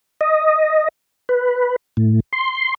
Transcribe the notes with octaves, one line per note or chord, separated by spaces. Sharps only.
D#5
B4
A2
C6